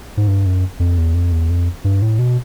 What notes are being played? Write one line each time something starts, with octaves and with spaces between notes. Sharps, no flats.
G#2
G2
F#2
F2
E2
F2
E2
F2
G2
A2
B2